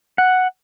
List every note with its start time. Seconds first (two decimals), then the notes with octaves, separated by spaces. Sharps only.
0.18 F#5